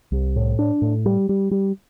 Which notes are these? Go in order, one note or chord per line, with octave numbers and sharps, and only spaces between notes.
C2
A2
D4
A2
G3
G3
G3